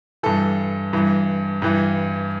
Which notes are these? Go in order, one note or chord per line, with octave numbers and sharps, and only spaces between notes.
G2 E3 A4
G2 E3
G2 E3